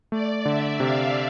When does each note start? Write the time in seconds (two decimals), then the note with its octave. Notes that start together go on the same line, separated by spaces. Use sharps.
0.12 A3 D5
0.45 D3 E5
0.80 C3 F5